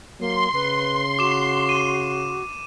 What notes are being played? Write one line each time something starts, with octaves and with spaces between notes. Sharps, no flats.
F#3 A#3 C6
C#3 B4
F#4 D6 E7
D#7